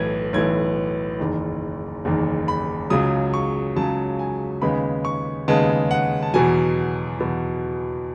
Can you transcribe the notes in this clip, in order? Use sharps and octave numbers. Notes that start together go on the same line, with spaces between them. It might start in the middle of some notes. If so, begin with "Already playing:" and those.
Already playing: B1 A2 E3 G#6
B1 A2 E3 G#6
F#1 E2 D#3
F#1 E2 D#3
B5
C#2 C#3 F#3 D#6
C#6
C#2 C#3 F#3 A5
G#5
D#2 C#3 G#3 B3 B5
C#6
D#2 C#3 G#3 B3 A5
F#5
A5
E2 B2 F#3 G#5
E2 B2 F#3